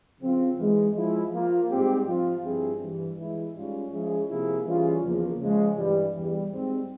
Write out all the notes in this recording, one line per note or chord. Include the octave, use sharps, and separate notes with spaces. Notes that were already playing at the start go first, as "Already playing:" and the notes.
C#3 F3 C4 F4
G#2 E3 G#3
F3 G#3 E4
F3 A#3 F4
G#2 G3 C4 G4
F3 C4 F4
G2 F3 C4 E4 G#4
G2 E3 G3
E3 G#3 E4
G#2 G3 C#4 F4
F3 G#3 C#4 E4 G#4
C3 F3 A#3 E4 G#4
E3 G3 C#4 F4 G#4
E2 C#3 F3 A#3
C#3 F3 G#3
G2 E3 G3
E2 E3 G3
G#2 G3 C4